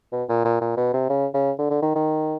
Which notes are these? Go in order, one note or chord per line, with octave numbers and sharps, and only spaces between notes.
B2
A#2
A#2
A#2
B2
C3
C#3
C#3
D3
D3
D#3
D#3